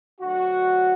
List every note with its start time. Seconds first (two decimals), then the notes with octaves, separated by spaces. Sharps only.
0.21 D2 D3 F#3 F#4